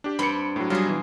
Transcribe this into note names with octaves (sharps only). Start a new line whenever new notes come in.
D4 G4
G2 C4 B5 C#7
A2 F#3
F#3 G3 F4 G#4
B2 E3